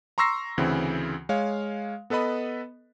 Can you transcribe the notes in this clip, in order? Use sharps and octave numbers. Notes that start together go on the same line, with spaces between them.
A#5 C6 C#6 E6 A#6 C7
D2 C#3 E3 C4
G#3 C#5 F5
B3 A4 B4 D#5 B5